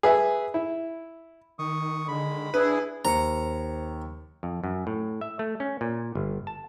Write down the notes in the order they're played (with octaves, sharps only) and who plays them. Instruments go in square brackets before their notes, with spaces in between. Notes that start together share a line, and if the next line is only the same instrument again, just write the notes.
[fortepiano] G#4 B4 E5
E4
[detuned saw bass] D#3 [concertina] C#6 D#6
[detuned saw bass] D3 [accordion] D#3 G#3 [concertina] B5
[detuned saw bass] D4 [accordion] E4 G#4 [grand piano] B4
[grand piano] D#2 [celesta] C5 C#7 [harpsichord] A#5
[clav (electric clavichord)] F2
F#2
A2
E5
A3
C#4
A#2
G1
A5